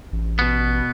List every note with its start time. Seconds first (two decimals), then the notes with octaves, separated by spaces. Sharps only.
0.13 A1
0.39 B2 B3